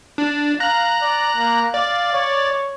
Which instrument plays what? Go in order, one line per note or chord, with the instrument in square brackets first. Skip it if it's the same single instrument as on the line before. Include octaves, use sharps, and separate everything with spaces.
[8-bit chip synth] D4
[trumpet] F5 [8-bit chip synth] A#5 F#6
[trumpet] D5
A#3
[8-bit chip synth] D5 [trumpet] F5
[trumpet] C#5